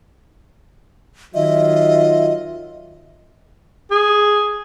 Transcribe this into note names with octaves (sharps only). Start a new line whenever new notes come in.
D#3 F#3 F4 D#5 E5
G#4